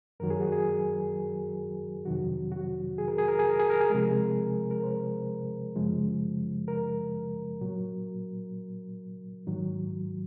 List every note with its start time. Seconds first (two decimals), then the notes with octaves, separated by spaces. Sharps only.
0.20 F#2 D#3 F#3 A#4
0.30 G#4
0.41 F#4
0.52 G#4
2.05 F2 C3 D#3 F#3 F#4
2.52 F#4
2.98 G#4
3.08 A#4
3.18 G#4
3.28 A#4
3.39 G#4
3.49 A#4
3.60 G#4
3.70 A#4
3.81 G#4
3.90 C3 F3 G#3 A#4
4.02 G#4
4.71 A#4
4.83 C5
5.76 F#2 C#3 F3 G#3
6.68 A#4
7.61 A#2 F#3
9.47 G#2 D#3 F#3